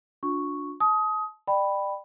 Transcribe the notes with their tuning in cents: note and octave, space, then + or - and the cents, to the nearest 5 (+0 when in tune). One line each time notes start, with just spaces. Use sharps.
D4 -15 F4 +45 C#6 +0
A5 -35 D#6 +20
D5 +30 G5 +0 B5 +0